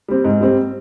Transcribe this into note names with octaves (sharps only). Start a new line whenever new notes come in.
G3 C4
G#2
G3 C4